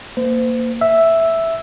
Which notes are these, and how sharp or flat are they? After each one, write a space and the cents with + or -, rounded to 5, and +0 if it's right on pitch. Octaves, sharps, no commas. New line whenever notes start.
A#3 -10 C5 -40
E5 +0 E6 +0